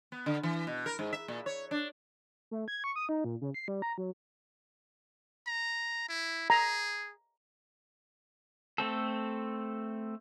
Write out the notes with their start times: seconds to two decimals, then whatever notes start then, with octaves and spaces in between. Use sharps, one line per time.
0.12 B3
0.26 D3
0.43 E3
0.67 B2
0.86 A#4
0.99 G#2
1.13 E5
1.28 A#2
1.46 C#5
1.71 D4
2.51 A3
2.68 G#6
2.84 C#6
2.96 D#6
3.09 D#4
3.24 A#2
3.41 C#3
3.54 C7
3.68 G3
3.82 A#5
3.98 F#3
5.47 A#5
6.08 E4
6.50 G#4 A#5
8.78 A3 C4 A4